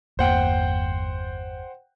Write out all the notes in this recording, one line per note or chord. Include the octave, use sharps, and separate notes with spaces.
G1 E2 A#3 C5 F#5 G5